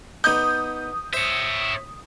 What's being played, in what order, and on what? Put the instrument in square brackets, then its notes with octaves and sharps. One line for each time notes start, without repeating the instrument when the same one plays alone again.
[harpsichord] B3 D#4 D6 [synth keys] D#6 [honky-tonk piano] G6
[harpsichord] C5 [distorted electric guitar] C#5 E5